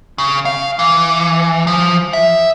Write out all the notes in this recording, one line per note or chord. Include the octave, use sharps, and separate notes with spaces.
C#3
F5
E3
F3
E5